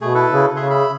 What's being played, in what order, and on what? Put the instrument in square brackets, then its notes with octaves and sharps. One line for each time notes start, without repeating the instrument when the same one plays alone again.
[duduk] B2 [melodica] A3 G#4
[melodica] E4 A4 B4
[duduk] C#3
[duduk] C#3 [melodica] G#4 E5 C6
[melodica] E5 B5